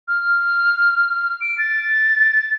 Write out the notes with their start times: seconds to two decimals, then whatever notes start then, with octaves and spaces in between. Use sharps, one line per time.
0.08 F6
1.41 D7
1.58 A6